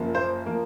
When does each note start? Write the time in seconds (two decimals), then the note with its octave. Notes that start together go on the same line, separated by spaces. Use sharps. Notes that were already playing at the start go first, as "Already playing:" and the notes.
Already playing: F#1 F#2 F3 A#3
0.15 C5
0.46 F3 A#3